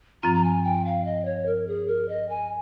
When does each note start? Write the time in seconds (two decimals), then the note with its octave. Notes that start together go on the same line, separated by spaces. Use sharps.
0.23 G2 F3 C4 F4 A#5
0.34 A#5
0.44 G#5
0.64 G5
0.85 F5
1.05 D#5
1.25 C#5
1.46 A#4
1.68 G#4
1.87 A#4
2.09 D#5
2.29 G#5